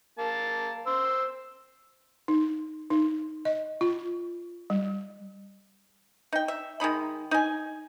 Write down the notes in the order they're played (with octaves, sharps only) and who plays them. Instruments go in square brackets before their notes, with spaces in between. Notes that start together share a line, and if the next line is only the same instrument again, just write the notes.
[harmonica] A#3 A5
C5 E6
[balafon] D#4
D#4
D#5
F4
G3
[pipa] D#4 G5
E5
D#3 G#3 D#4 B5
D#4 G#5